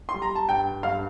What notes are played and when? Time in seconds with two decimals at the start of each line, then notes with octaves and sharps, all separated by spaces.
0.09 C6
0.14 G3
0.22 A#5
0.35 A5
0.49 G2 G5
0.83 G2 F5